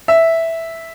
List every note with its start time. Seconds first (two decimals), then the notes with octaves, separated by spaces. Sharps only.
0.08 E5